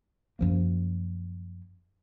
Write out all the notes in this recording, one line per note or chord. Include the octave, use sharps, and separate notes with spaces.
F#2 F3 A#3